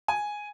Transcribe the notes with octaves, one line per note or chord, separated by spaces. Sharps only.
G#5